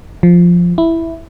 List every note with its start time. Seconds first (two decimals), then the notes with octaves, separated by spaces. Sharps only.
0.23 F3
0.78 E4